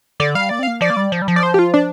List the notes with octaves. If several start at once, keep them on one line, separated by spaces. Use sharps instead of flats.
D3 D5
G3 F5
A#3 D5
C4 F5
A#3
F3 D5
A#3
G3
F3
G3
F3
D5
C5
G4
F4
D4